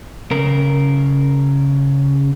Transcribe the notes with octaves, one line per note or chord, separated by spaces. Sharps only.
C#3 A#4